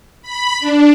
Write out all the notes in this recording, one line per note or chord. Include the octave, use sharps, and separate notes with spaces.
B5
D4